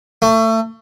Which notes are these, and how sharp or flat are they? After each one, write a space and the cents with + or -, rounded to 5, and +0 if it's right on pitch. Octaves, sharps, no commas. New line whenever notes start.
A3 +30